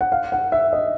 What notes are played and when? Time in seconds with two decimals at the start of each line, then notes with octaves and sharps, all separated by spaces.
0.01 F#5
0.12 F5
0.32 F#5
0.52 E5
0.73 D#5